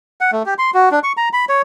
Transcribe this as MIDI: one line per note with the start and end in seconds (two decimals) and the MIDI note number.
0.21 0.31 78
0.32 0.43 57
0.46 0.54 67
0.58 0.71 84
0.74 0.89 66
0.91 0.99 62
1.03 1.12 85
1.17 1.29 82
1.33 1.45 83
1.49 1.62 73